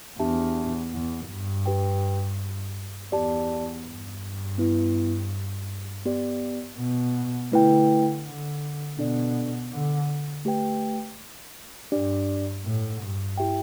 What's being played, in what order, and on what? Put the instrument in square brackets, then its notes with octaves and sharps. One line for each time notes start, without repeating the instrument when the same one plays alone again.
[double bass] E2 [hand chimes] D4 G4 E5 A5
[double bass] E2
G2
[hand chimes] D4 G4 B4 G5
[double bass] E2 [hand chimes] G4 D5 A5
[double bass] G2
[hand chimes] B3 E4 B4
B3 G4 D5
[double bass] B2
[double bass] D3 [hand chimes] A3 E4 B4 G5
[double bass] D3
[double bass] B2 [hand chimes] D4 A4 D5
[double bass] D3
[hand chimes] A3 G4 B4 G5
[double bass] G2 [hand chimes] D4 G4 D5
[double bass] A2
G2
[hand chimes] E4 G4 E5 G5